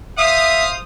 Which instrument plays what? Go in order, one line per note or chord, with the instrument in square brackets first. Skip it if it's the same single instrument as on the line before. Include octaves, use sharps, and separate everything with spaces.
[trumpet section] C5 F5 D#6 [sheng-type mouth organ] E5